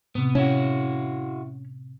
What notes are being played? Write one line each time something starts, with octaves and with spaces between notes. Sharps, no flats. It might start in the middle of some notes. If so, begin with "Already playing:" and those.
A2 C3 B3
C#4 E4 F#4